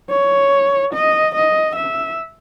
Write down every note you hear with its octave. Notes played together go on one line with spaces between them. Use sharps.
C#5
D#5
D#5
E5